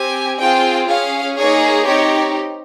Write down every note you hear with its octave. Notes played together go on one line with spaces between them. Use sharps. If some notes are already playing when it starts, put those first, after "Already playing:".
Already playing: C4 G4 G#5
C4 F4 G#4 G5
C#4 G#4 F5
A#3 D#4 G#4 C#5
C4 D#4 G4 C#5